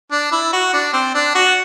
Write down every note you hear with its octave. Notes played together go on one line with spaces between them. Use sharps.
D4
E4
F#4
D4
C4
D4
F#4